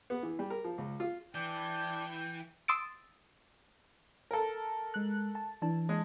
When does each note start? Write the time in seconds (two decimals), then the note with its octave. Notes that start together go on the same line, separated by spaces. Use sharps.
0.10 B3
0.23 E3
0.39 G3
0.50 A#4
0.64 F3
0.78 C#2
1.00 F4
1.35 E3 D4 D5 G5 A5 G6
2.68 C6 D#6 E6 A6 D7
4.31 A4 A#4
4.94 G#3 F#6
5.35 A5
5.62 E3 D4 A5
5.89 G#3